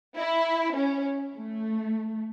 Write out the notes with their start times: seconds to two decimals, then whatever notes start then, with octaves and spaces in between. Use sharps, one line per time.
0.16 E4
0.76 C#4
1.36 A3